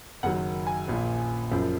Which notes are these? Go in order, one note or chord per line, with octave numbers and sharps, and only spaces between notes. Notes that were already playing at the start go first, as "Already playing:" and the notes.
F#1 F#2 D#3 F#3 F#5
G#5
A#1 A#2 F3
F#1 F#2 F3